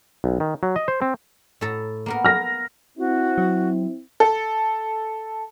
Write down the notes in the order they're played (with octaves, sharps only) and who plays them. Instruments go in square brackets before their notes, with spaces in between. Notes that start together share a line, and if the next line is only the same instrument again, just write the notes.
[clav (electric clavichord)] B1
D#3
F#3
D#5
C5
C4
[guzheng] A2 A4 A#5
A#3 B3 A#4
[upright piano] F6 A#6
[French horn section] C4 E4 [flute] F#4
[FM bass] F#3
[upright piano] A4